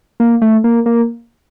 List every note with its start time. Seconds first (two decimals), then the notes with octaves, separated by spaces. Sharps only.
0.20 A#3
0.42 A3
0.64 A#3
0.86 A#3